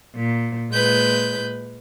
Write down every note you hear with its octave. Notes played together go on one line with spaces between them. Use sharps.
A#2
A#2 G#3 B4 G6